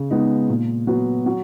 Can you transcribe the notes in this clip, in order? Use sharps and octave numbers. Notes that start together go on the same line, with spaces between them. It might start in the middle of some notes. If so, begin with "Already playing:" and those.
Already playing: C#3
G#3 B3 D#4
A#2
F#3 B3
F#3